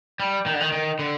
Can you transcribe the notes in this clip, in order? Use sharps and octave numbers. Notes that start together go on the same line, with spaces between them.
G3
D#3
D3
D#3
D#3
D3